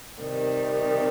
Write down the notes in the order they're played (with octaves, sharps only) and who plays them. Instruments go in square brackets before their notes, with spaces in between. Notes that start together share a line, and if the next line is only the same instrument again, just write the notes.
[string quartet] C3 D#3 G3